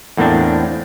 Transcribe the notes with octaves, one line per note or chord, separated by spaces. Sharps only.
E2 A2 A#3 C4 D4